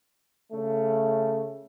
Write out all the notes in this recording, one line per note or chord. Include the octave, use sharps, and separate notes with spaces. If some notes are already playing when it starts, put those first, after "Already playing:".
C#3 A3